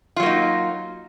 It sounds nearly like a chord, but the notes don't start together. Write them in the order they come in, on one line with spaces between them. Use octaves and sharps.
F4 F#3 A#3 D#4